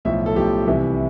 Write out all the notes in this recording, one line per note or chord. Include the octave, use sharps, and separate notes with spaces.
B1 A2 F3 E5
A4
B1 A2 F3 G4
C2 C3 E3